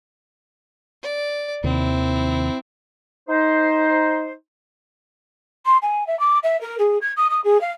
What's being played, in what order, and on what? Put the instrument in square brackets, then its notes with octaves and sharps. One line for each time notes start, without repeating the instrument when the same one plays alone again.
[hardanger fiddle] D5
[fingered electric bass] D#2 C3 D#3 [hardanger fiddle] C4 E4
[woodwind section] D#4 C5
[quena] C6
G#5
E5
D6
E5
A#4
G#4
G#6
D#6
D#6
G#4
F5